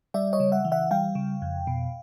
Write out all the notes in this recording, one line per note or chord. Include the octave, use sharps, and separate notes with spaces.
G3 D5 E5
C#5 D#5
C#3
E5 F#5
E3
E5 F#5
G3 F5 G5
C#3
F2
B2